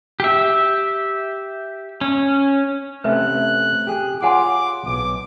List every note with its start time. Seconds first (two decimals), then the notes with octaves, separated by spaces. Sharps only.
0.20 G4 E5
2.01 C#4
3.04 C3 A3 C#4 B4 E5 F#6
3.87 G4 G#4
4.23 F4 G#4 C#5 F#5 G#5 C6 D6
4.86 B1 D6